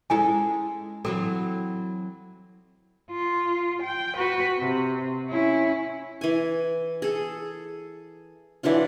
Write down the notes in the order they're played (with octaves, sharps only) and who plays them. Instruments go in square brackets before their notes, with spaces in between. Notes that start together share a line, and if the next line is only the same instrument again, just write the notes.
[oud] G#3 C#4 A4 [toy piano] E4 G#5
[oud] E3 F#3 C4 [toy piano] A4
[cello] F4
G5
F#4 B4
C3
C#4 E4
[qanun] E3 G#5
G#4 A4
E3 F#3 D4 F4